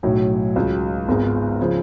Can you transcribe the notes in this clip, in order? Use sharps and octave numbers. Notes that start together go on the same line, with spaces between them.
B1 A2 F#3
C#2 C#3 F#3
G#1 G#2 G#3 B3
C#3 F3